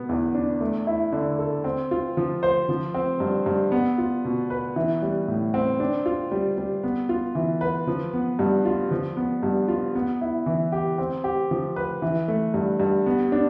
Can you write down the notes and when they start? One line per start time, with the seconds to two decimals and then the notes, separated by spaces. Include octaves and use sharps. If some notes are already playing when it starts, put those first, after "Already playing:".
Already playing: B2 B3
0.09 E2
0.35 D4
0.61 A3
0.87 E4
1.12 D3
1.39 A4
1.64 C4
1.91 F4
2.17 F3
2.43 C5
2.69 F3
2.94 C4
3.20 G2
3.46 G2
3.72 B3
3.98 F4
4.25 B2
4.50 B4
4.76 E3
5.02 G3
5.28 A2
5.54 C4
5.80 D4
6.06 F4
6.31 G3
6.58 G3
6.83 B3
7.09 F4
7.35 E3
7.61 B4
7.87 F3
8.14 B3
8.39 G2
8.65 F4
8.91 F3
9.17 B3
9.43 G2
9.68 F4
9.95 B3
10.21 E4
10.46 E3
10.72 G4
10.98 C4
11.24 G4
11.51 F3
11.76 B4
12.02 E3
12.28 A3
12.54 G2
12.80 G2
13.06 B3
13.32 D4